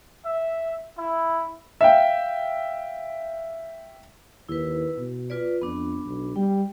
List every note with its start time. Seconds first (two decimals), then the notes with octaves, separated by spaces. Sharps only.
0.24 E5
0.96 E4
1.81 E5 F5 G5
4.49 D#2 E4 B4
4.97 B2
5.30 F4 B4 D5
5.62 F2 B3 D4
6.06 B1
6.36 G3 G5